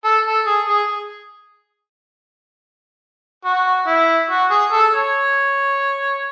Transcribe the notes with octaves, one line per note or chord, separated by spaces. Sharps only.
A4
A4
G#4
G#4
F#4
E4
F#4
G#4
A4
C#5